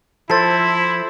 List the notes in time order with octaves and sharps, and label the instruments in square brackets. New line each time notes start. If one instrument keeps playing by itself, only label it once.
[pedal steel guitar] F3 [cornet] E4 [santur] A4 C5 [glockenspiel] C6 A6 C7